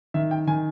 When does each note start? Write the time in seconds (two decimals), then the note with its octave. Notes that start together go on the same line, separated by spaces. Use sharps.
0.14 D#3 E5
0.31 G5
0.47 D#3 G#5